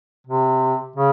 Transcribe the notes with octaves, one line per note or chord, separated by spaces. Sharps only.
C3
C#3